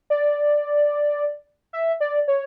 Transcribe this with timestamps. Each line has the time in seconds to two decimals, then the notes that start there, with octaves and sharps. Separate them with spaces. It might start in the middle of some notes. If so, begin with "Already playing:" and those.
0.10 D5
1.73 E5
2.00 D5
2.28 C#5